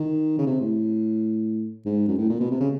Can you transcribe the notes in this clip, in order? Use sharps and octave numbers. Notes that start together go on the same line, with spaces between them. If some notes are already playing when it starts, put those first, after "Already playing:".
Already playing: D#3
C#3
C3
A2
G#2
F#2
A2
A#2
B2
C3
C#3